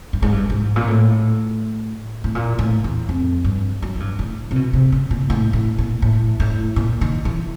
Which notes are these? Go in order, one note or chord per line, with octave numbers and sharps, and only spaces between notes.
G2
G#2
G2
G#2
A#2
A2
A2
A#2
A2
E2
F2
G2
F#2
G#2
G2
A2
C3
B2
C3
C#3
A#2
A2
A2
A#2
A2
A2
A#2
D#3
E3